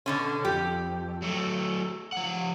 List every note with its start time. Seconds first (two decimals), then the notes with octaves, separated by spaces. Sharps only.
0.06 B2 D3 C#4
0.45 F2 G4
1.22 F#3 A3
2.12 F3 F#5